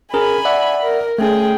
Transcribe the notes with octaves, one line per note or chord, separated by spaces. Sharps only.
C#4 G#4 A#4 G#5 B5
D5 E5 F#5
A#4
A3 C#4 G#4 G5